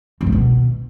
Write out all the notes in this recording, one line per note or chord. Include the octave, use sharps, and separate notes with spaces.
G2
A2
B2